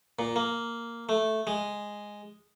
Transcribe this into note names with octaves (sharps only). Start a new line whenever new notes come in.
A#2
A#3
A3
G#3